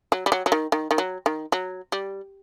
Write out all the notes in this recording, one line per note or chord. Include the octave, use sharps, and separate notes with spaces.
F#3
G3
F#3
F#3
D#3
D#3
D#3
F#3
D#3
F#3
G3